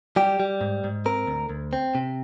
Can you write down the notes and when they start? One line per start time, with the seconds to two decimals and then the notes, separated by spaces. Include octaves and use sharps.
0.16 G3 G4
0.40 G3
0.61 G#2
0.84 G#2
1.06 C4 A#4
1.27 D2
1.50 D2
1.73 C4
1.95 C3